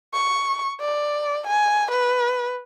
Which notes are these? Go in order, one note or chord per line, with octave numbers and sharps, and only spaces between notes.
C#6
D5
G#5
B4